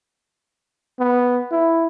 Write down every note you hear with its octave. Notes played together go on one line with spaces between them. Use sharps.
B3
E4